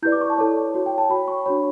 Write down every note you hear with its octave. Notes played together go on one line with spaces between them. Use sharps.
E4 G4 B4 D5 G6
D6
C#6
A5
E4 A4 C#5
F#4 C#5
G5
A5
F#4 C#5 B5
C#6
D4 F#4 C#5 B5